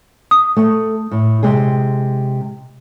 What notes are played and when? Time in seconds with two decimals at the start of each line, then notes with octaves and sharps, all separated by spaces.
0.31 D#6
0.56 A3
1.11 A2
1.43 C3 G#3 G#4